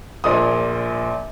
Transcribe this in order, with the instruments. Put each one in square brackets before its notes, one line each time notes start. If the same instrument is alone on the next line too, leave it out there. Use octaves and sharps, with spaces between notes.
[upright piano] A#1 A#2 D#6